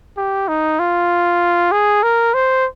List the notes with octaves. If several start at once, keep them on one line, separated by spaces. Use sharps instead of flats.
G4
D#4
F4
G#4
A#4
C5